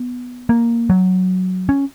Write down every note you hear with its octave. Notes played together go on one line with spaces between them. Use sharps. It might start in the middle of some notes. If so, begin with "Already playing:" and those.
Already playing: B3
A#3
F#3
C#4